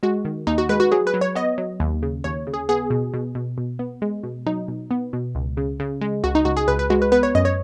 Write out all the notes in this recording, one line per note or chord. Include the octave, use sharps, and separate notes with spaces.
G#3 F#4
D#3
D#2 D#4
F#4
G#3 B4
F#4
F#3 G#4
B4
F#3
C#5
B3 D#5
F#3
D#2
C#3
D#2 C#5
C#3
G#4
B3 G#4
B2
B2
B2
B2
B3
G#3
B2
F#3 D#4
B2
B3
B2
C#2
C#3
C#3
G#3
C#2 F#4
D#4
C#2 F#4
G#4
C#2 B4
B4
G#3 F#4
B4
B3 B4
C#5
F#2 D#5
C#5